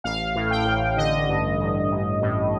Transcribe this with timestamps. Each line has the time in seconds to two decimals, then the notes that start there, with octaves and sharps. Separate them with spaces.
0.04 A1 F5
0.35 A2
0.51 G5
0.66 A1
0.97 D3 D#5
1.29 G2
1.59 A1
1.91 A1
2.21 A2